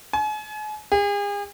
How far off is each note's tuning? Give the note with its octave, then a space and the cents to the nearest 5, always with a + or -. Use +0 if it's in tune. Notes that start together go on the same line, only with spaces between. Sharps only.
G#5 +40
G#4 -40